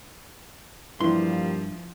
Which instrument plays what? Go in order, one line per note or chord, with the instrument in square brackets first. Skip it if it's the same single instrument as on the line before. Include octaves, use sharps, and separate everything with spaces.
[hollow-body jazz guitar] G2 C6 [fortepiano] E3 [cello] F3 [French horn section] G3 A#3